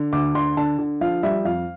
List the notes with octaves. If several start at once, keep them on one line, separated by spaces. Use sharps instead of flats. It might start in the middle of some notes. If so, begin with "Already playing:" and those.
Already playing: D3
D2 D6
D3 C6
D3 A5
D3
F3 F5
G3 E5
F2 F5